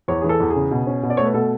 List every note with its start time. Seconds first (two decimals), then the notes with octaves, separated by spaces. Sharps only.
0.08 E2 C#5
0.21 E3 G#4
0.29 A4
0.40 E2
0.50 G#4
0.56 C#3
0.71 B2
0.87 C#4
1.03 B2
1.10 D5
1.17 A3 C#5
1.25 B4
1.34 B2 A4